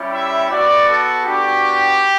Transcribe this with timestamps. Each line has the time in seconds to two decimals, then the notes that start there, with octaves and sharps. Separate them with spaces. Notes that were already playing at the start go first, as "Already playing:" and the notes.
Already playing: G3 C#4 E4 G4
0.12 E5
0.50 B3 F#4 D5
0.88 A4
1.25 B3 D4 F#4 G4